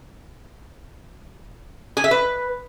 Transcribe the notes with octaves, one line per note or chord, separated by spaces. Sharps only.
G#4
E5
B4